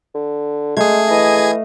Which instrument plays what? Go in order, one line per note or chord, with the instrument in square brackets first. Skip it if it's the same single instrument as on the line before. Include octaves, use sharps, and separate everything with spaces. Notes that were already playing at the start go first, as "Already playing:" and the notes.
[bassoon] D3
[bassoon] G#3 [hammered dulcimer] A3 F5 [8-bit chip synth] G#4 G#6
[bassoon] E3 [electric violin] D#5